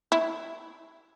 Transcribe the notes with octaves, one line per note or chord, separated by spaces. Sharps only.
E4